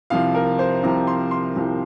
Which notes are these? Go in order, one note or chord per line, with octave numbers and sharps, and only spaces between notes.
C2 C3 F3 F5
A#4
C5
C2 C3 F3 A#5
C6
C6
C2 C3 F3